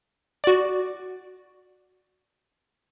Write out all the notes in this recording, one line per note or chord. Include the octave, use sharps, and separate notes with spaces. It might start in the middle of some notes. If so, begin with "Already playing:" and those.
F#4 D5